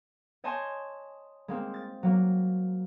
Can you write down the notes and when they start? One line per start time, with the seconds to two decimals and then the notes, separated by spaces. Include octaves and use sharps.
0.44 C#5 D#5 G#5 A5 C6 G6
1.48 G#3 A#3 C4
1.74 A6
2.03 F#3 A#3